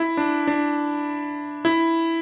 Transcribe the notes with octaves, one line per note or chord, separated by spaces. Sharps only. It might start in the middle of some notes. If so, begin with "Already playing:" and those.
Already playing: E4
D4
D4
E4